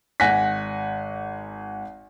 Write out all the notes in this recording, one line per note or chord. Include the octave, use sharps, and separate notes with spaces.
G#1 F#5 G#5 F#6 A#6 B6